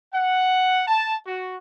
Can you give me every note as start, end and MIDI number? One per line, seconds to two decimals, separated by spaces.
0.12 0.81 78
0.87 1.15 81
1.26 1.55 66